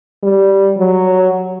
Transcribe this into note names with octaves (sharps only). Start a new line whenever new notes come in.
G3
F#3